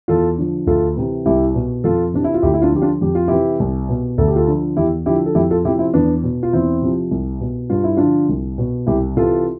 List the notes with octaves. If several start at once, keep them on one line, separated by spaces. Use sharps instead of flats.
E2 F4 A4
D3 F3
D2 F4 A4
C3 E3
C2 E4 G4
B2
F2 F4 A4
C3 E3 D4
E4
F4
D2 E4 G4
E4
D4 F4
D3 F3 G4
D4 F4
F2 G4
F4
C3 E3 E4 G4
C2
B2
D2 A4
G4
F4 A4
D3 F3
E2 E4 G4
D3 F3 E4 G4
A4
F2 E4 G4
F4 A4
C3 F3 E4 G4
C4 E4
E2 B3 D4
B2
F4
E2 C4 E4
C3 F3
C2
B2
G2 F4
E4
D3 F3 D4 F4
C2
B2
C2 E4 G4
C3 E3 F4 A4